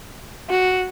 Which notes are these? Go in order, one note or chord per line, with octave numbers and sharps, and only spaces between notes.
F#4